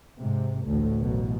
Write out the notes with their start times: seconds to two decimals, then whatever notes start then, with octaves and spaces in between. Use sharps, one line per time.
0.20 G#2 C3
0.66 A1 D2 A2
0.99 A1 F#2 B2